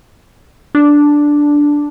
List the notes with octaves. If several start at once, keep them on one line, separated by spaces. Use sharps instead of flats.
D4